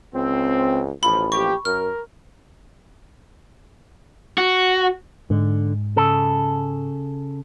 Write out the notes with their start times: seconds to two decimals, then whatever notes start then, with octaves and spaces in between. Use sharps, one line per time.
0.14 C#2 C4
1.03 A1 F3 B5
1.32 F3 A#3 G4 C#6
1.65 F#2 A#4 F6
4.38 F#4
5.30 G#2 D3
5.96 C#3 A4